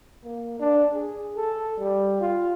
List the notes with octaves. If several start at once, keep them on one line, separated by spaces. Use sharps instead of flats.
A#3
D4
G#4
A4
G3
F4